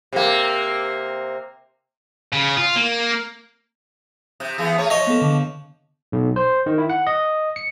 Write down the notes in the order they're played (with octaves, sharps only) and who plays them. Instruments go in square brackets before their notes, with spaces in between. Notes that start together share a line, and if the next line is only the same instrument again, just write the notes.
[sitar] C3 A#3
[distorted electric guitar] C#3
F4
A#3
[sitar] C3 [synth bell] D#6 F#6 G6
[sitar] E3 B3 G#4
A3 G#4 C#5
[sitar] F3 [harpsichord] C#5 D#5 [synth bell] A#6
[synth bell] B3 A4
D3
[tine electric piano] B1
C5
D#3
E4
F#5
D#5
C#7